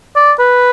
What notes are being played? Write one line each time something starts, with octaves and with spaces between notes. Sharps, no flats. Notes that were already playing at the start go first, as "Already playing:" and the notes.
D5
B4